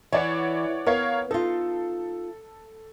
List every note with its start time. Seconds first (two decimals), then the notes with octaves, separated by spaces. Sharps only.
0.12 E3 C#5 D5 F#5
0.86 B3 A#4 C#5 F5
1.31 D#4 F4 A4